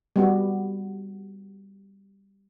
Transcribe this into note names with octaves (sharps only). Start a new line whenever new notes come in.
G3 B3 F#4